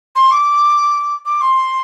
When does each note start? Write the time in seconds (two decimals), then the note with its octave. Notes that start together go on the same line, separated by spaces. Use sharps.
0.16 C6
0.31 D6
1.26 D6
1.41 C6